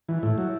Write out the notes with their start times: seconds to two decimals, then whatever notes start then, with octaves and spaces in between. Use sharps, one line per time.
0.09 E3
0.23 A2 E4
0.38 F#3